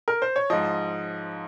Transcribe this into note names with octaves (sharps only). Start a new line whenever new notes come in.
A#4
C5
C#5
G#2 F3 D#5